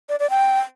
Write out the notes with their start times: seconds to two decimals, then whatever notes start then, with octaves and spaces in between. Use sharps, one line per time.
0.09 D5
0.20 D5
0.30 G5